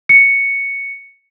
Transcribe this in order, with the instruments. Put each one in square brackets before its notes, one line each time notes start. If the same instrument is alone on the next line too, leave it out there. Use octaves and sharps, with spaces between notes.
[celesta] C#7